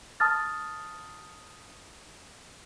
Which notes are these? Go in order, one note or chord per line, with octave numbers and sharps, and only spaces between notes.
A5 D#6 F6 A6